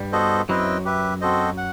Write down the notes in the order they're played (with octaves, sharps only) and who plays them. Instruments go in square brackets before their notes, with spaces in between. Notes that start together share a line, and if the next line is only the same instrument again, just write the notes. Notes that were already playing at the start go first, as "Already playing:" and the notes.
Already playing: [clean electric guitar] G2 G3
[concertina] B3 F#4 A4 C5 D#5
[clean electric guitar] F#2 F#3 [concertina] C4 E4 B4 D#5 G5
[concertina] G4 B4 E5
C4 F#4 A4 C5 D#5
F#5